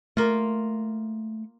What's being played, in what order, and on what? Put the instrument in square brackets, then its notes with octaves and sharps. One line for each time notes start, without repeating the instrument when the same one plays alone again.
[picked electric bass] A3 [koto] A#3 F4